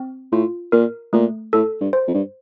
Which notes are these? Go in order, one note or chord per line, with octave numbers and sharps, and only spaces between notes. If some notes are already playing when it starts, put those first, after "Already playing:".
Already playing: C4
A2 F4
A#2 A#4
A#2 A3
A2 A4
G2
C5
F2
G2